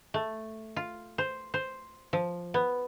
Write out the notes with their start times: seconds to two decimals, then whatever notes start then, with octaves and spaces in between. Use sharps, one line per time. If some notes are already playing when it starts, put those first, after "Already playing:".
0.14 A3
0.76 F4
1.18 C5
1.54 C5
2.13 F3
2.54 B3